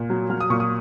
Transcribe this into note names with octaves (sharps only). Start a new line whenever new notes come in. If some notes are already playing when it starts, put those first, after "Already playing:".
Already playing: A#2
F#3
F#3 F6
D#6
A#2 C#6
D#6